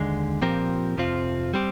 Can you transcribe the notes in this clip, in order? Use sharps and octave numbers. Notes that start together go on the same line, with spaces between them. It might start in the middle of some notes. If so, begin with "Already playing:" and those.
Already playing: D#2 D3 G#3
A#2 F3 C4 G4 A#4
F2 C3 F3 C4 F4
G3 C4 G4